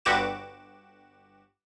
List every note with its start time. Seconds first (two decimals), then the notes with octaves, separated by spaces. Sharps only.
0.05 G1 G2 F#4 G4 D6 E7